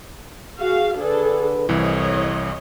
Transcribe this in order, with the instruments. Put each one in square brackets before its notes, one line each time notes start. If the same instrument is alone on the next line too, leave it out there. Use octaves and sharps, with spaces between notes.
[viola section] F#4 F5 [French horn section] G#4
[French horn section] D3 B4 [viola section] D4 G#4 A4
[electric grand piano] C2 E3 [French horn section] F2 [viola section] C#5 D#5